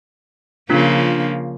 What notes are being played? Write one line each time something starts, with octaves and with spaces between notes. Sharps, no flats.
C#3 F3 A#3 D4 F4